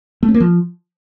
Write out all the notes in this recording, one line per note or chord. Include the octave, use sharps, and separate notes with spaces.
A3
C#4
A#3
F3